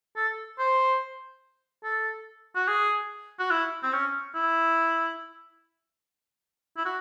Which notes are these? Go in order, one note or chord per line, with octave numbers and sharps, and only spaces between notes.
A4
C5
A4
F#4
G#4
F#4
E4
C4
C#4
E4
E4
F#4